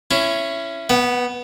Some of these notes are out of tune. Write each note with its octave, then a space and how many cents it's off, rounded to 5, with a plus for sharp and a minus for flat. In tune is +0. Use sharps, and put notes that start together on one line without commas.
C#4 -5 E4 +20
B3 -10 F#5 +40